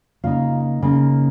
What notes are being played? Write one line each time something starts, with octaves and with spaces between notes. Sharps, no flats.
C#3 A#3 D#4 F4 F5
C#3 A#3 D#4